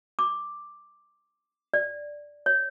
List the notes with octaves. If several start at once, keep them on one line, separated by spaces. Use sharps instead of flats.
D6
D5
C#5